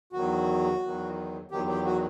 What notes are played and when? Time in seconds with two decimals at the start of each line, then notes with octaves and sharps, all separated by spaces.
0.13 E2 D#3 F#3 F#4
0.82 E2 D#3 F#3
1.51 E2 D#3 F#3 G4
1.68 G4
1.86 F#4